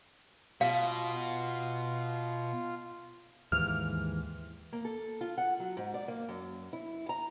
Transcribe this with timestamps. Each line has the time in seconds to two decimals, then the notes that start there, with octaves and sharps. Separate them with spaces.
0.61 B2 F4 F5
3.52 D#2 G#2 E3 F6
4.73 A#3
4.85 A4
5.21 F4
5.38 F#5
5.60 F#3
5.77 G#2
5.94 D5
6.08 A#3
6.29 F#2
6.73 E4
7.09 A#5